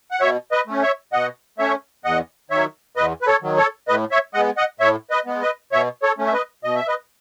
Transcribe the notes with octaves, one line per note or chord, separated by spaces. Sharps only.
F#5
B2 C#5 E5
B4 D#5
A3 C#4
C#5 E5
B2 D#5 F#5
A3 C#4 C#5 E5
E2 D#5 F#5
D#3 F#3 C#5 E5
E2 B4 D#5
B4
A4 C#5
D#3 F#3
A4 C#5
A2 B4 D#5
C#5 E5
G#3 B3 D#5 F#5
D#5 F#5
A2 C#5 E5
B4 D#5
G#3 B3
B4 D#5
B2 C#5 E5
A4 C#5
A3 C#4
E5
B4 D#5
B2 D#5
E5
B4 D#5